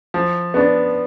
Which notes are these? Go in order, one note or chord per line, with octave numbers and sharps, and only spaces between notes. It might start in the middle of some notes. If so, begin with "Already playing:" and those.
F3
B3 D4